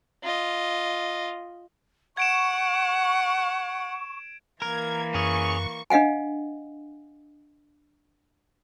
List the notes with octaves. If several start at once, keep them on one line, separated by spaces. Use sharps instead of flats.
F4 D#5
F#5 C#6 G#6 D7 E7
E3 A#3 A#4 G#6
F#2 C#4 G#4 C#6
D4 D#5 F5 F#5 G#5